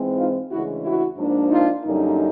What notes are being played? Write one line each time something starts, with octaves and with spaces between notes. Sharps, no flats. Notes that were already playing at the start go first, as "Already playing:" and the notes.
Already playing: G#2 E3 G#3 C4
D#4 F4
D2 C#3 E3 G#3 E4 F#4
E4 F#4
G#2 F3 A#3 D4
D#4 F4
F#2 D3 G3 A#3 D#4